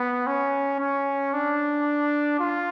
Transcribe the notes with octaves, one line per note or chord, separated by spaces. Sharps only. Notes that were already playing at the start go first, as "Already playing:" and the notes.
Already playing: B3
C#4
C#4
D4
F4